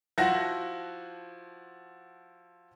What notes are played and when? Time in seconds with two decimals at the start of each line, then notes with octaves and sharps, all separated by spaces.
0.18 F3 E4 F#4 F#5 A#6